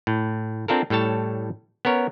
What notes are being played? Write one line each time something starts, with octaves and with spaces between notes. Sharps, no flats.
A2
C4 D4 F4 A4 A#4
A2 G3 A4 C#5 A5
B3 C#4 A#4 C#5